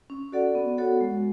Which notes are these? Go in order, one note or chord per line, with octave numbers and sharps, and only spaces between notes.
C#4
F#4 A4 D5 F#5
B3
F#4 A4 C#5 F#5
G#3